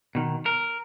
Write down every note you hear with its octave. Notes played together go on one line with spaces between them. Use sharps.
B2 D#3
A#4